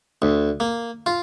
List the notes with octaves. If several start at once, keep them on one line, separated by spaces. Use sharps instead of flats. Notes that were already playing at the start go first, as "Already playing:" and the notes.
D2
A#3
F4